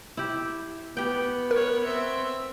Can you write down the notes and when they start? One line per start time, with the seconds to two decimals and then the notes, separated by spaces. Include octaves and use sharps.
0.17 E4 G4
0.97 B3 G4 G5
1.51 A#4 B4 C#5
1.84 C4 E5